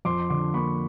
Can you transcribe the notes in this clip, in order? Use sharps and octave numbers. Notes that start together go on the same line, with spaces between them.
F2 C6 D6
D3 C6 D6
A#3 B5 C#6